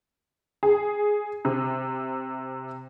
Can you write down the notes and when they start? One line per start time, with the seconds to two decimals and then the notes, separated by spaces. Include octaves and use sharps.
0.63 G#4
1.45 C3